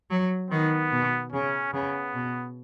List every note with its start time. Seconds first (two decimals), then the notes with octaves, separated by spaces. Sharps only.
0.10 F#3
0.50 D#3 B3
0.92 B2
1.32 C#3 C#4
1.73 C#3 B3
2.15 B2